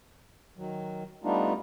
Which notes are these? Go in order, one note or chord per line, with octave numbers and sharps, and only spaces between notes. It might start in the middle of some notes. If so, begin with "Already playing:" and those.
D#3 F#3
G3 A3 B3 D4 D#4 F4